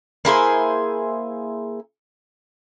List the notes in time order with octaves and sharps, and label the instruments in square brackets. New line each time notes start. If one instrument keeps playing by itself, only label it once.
[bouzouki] A#3 E4 G#4 C5